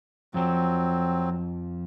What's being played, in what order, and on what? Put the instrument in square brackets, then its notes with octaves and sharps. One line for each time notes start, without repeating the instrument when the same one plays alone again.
[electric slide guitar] F2 F3 [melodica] F#3 C4